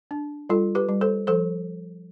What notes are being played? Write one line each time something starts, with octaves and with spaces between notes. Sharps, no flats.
D4
G3 F4 A4
G4 B4
G3
A4 C5
F3 A4 C5